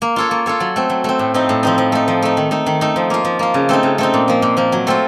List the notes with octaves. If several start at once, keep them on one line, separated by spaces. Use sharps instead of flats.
A#3
F4 A4 C#5
A#3
F4 A4 C#5
F#3
A3 C4
F#3
A3 C4
A2
F3 C4 D#4
A2
F3 C4 D#4
F3
A3 D#4
F3
A3 D#4
D#3
A3 D#4
D#3
A3 D#4
F3
A#3 F4
F3
A#3 F4
C#3
A3 C4 D#4
C#3
A3 C4 D#4
A#2
F3 A#3
A#2
F3 A#3
F#3
A3 C4 F4